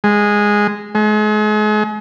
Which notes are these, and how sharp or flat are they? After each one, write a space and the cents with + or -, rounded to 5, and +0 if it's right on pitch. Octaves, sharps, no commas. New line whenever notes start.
G#3 -5
G#3 +40